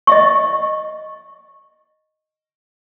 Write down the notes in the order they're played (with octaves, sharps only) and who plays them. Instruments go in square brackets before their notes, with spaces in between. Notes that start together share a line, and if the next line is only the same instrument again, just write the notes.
[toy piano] D#5 E5 C#6